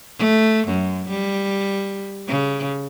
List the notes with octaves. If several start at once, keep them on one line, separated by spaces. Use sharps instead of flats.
A3
F#2
G3
C#3